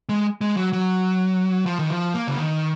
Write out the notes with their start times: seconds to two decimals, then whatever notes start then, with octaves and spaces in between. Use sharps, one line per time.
0.09 G#3
0.41 G#3
0.57 F#3
0.73 F#3
1.66 F3
1.79 D#3
1.90 F3
2.14 A#3
2.27 C#3
2.38 D#3